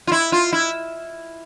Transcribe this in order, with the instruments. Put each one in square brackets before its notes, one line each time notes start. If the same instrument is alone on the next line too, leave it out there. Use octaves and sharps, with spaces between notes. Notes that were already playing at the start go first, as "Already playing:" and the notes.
[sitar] F4
E4
F4
E4